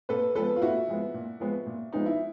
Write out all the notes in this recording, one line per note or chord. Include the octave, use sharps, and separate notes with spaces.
A#2 A4 B4
F3 G#3 B3 A4 B4
F4
A#2 E4 F#4
F3 G#3 B3
A#2
F3 G#3 B3
A#2
F3 G#3 B3 D#4
E4